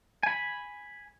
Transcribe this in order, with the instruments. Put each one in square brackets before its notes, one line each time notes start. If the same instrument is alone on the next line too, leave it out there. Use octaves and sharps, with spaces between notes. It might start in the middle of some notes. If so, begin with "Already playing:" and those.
[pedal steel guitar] G#5 B5